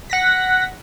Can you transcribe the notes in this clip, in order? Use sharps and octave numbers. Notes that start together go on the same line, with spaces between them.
F#5 A#6 B6